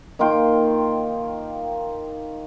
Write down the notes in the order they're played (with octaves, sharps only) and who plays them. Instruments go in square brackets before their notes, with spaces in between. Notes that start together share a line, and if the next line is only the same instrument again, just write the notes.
[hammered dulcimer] D#3 A#3 F4 G5